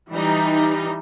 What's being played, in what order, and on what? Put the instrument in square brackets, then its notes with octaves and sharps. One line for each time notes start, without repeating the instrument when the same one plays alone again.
[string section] E3 G3 D#4